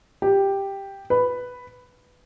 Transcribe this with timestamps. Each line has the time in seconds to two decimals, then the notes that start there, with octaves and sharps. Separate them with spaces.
0.22 G4
1.10 B4